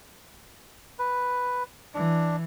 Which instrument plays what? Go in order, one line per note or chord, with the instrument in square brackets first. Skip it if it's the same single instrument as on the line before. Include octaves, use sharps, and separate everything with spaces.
[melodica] B4
[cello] E3 [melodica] D4